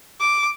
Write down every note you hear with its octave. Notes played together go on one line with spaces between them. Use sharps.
D6